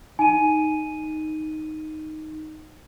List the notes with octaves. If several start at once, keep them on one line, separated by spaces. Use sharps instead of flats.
D#4 G#5 D#7